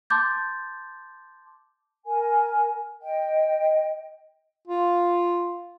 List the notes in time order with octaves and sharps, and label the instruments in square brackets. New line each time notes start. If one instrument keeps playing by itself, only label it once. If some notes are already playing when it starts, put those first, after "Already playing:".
[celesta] A5 C6 D6 G6 A6
[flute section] A#4 G#5
D#5 G5
[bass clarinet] F4